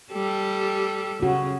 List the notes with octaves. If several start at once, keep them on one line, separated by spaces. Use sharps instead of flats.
G3 G4 A4
C#3 F#4